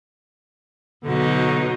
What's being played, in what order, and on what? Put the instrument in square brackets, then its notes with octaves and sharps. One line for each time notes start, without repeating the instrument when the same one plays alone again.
[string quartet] B2 F#3 D#4 [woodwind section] D3